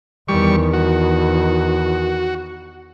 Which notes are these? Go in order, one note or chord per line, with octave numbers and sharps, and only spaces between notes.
E2 D#3 G3 C#6
F#4